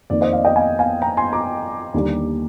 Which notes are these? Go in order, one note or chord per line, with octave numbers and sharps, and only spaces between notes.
F2 D#3 A#3 D5
C5 D#5
D5 F5
D#5 G5
F5 G#5
F5 G#5
G5 A#5
G#5 C6
A#5 D6
D#2 D3 G3 A#3